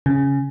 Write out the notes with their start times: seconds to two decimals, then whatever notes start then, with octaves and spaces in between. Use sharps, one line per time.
0.06 C#3